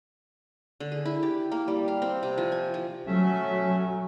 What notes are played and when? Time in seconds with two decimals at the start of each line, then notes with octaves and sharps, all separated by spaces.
0.80 D3
0.92 G#4
1.06 E4
1.23 G4
1.52 A#3
1.68 G3
1.88 F5
2.02 C4
2.23 C3
2.38 F3
2.52 G#5
2.74 F3
3.07 F#3 A3 C#4 E5